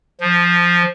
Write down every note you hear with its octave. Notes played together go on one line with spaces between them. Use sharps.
F3